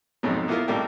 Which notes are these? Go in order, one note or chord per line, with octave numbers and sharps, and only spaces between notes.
F2 G#2 B2 F#3
A#3 B3 E4 F4 A#4
G#1 A2 G3 A#3 G4 A#4